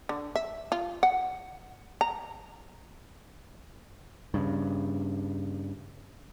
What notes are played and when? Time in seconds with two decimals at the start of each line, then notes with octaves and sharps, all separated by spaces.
0.09 D3
0.36 E5
0.72 F4
1.03 F#5
2.01 A#5
4.34 G2 C#3